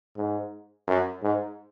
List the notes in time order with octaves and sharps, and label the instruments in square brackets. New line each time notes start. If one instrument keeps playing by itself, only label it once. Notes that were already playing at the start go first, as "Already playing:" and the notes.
[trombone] G#2
F#2
G#2